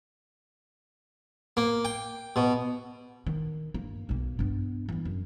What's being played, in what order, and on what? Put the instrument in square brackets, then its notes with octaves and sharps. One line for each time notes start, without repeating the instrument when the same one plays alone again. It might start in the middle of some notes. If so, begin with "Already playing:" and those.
[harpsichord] A#3
G5
B2
[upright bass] D#3
G2 A#3
B1 A#3
G2 B3
E3 G3
F#2